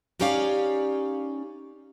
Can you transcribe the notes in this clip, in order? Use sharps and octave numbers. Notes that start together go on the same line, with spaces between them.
C#4 D#4 G4 C#5 D5 F5